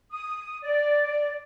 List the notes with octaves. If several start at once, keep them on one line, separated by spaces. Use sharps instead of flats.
D#6
D5